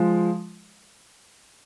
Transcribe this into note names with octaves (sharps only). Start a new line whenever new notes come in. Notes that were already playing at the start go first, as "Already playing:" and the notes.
Already playing: F3 G#3